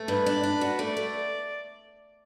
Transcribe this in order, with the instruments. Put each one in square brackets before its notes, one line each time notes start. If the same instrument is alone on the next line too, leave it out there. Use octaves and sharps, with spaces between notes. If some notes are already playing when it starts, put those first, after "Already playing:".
Already playing: [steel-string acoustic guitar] A3
[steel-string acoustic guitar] G2 [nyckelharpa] B4
[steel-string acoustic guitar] D4
D4
F#4
[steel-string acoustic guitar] A3 [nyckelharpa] D5
[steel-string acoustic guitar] A3